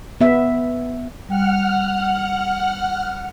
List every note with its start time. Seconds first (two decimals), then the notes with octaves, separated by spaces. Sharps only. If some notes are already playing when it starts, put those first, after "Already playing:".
0.21 B3 E5
1.29 G3 F#5 G5 F6